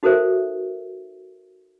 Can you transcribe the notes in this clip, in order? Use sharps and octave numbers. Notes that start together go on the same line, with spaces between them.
D#4 F#4 A4 A#4 C5 E5